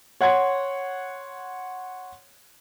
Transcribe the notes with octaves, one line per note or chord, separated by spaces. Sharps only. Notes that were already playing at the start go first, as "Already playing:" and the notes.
C#5 F#5 C6 G#6